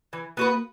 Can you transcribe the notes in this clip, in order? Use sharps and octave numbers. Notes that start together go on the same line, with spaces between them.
E3
A#3 B3 F#4 B4